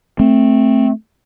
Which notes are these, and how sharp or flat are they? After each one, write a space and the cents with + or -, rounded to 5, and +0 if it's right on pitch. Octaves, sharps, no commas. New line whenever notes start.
A3 +0 C4 +5